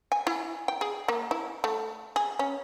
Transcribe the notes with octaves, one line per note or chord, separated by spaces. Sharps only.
G#5
E4
G5
G#4
A#3
E4
A3
G#4
C#4